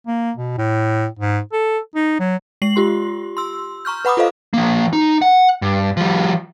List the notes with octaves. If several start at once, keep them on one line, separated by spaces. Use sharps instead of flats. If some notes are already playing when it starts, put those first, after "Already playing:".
A#3
B2
A2
G#2
A4
D#4
F#3
G#3 C7 F#7
F4 G4 C6
C6 E6
A#5 C#6 F6 G6
B4 F#5 B5 D6 D#6
F4 A4 C5 D#5 F5
F3 A#3
D#4
F#5
G2
F3 G3